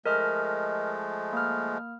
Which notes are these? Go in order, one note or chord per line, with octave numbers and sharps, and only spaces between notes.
F3 G#3 A3 A#4 D#5 F6
A#3 F6